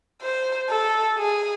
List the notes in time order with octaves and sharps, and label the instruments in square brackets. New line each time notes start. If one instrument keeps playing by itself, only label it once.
[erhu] C5
A4
G#4